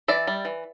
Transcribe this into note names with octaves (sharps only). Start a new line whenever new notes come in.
E3 D5 E5
G3
E3